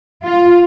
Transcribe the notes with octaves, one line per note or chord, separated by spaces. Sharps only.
F4